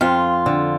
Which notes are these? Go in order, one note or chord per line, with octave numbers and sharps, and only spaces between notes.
F2 F4
D3